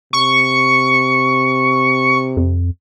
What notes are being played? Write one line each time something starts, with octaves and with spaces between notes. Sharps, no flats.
C3 C#6
F2